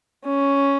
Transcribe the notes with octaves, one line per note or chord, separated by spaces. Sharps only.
C#4